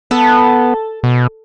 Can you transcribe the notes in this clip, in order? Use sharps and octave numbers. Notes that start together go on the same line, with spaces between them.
B3 A4
B2